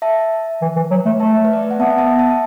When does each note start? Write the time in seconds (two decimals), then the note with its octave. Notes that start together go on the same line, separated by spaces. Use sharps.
0.02 E5 A5
0.62 E3
0.76 E3
0.91 F#3
1.05 A3
1.20 A3 E5 A5
1.45 B4
1.53 D5
1.63 E5
1.71 F#5
1.79 B3 E5 A5
1.90 F#5
1.98 E5 A5
2.19 E5 A5
2.30 A5